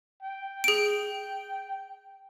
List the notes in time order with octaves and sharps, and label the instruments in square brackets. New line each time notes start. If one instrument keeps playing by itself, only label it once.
[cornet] G5
[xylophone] G#4 D7